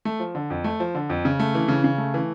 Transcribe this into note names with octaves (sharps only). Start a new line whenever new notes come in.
A3
F3
D3
F2
A3
F3
D3
F2
C#3
A3
E3
C#3
C#3
A3
E3